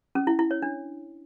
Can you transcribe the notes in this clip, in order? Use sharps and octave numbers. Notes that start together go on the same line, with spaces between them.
C#4
E4
E4
C#5
D4